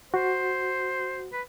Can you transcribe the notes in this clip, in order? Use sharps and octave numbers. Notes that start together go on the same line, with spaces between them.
F#4 C5
B4